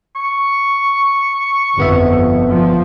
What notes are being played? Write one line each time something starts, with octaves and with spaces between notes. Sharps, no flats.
C#6
G1 F2 B3 E5
F3